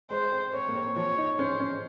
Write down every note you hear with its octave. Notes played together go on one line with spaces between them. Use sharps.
G#3 C5
C4
C4 C#5
A#3
C4
F3 C#5
D#4
C#4 C5
C#4